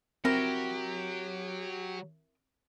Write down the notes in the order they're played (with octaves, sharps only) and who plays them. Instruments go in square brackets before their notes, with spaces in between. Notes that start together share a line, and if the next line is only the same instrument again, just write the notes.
[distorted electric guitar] F#3 [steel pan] C4 [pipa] E4 A#4 [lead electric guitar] G4